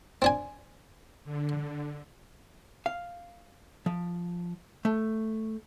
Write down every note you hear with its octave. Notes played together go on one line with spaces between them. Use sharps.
C4 D4 G#5
D3
F5
F3
A3